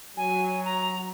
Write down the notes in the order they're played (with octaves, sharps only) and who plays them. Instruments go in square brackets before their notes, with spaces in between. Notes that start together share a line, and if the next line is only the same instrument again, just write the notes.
[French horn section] F#3 [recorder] G#5
[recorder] A#5